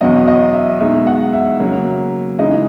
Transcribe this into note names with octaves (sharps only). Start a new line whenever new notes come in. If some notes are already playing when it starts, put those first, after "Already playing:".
E2 B2 F#3 B3 D#5
D#5
E5
B2 G#3 D#4 E5
F#5
E5
C#3 F#3 A#3
C#3 E3 G#3 D#4 D#5